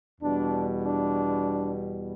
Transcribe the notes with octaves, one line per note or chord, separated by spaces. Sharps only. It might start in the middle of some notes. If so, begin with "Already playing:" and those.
E2 B2 G3 D4
D4